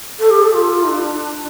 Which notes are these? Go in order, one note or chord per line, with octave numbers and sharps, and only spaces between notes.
A4
G4
A4
F4
D4